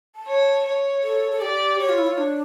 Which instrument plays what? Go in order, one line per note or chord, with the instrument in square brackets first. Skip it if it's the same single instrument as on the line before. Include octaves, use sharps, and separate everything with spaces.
[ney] A5
[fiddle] C#5
[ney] A5
[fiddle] C#5
[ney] A4
A4
[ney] G4 [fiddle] D5
[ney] G4 [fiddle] C#5
[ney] F4
E4
F4
D4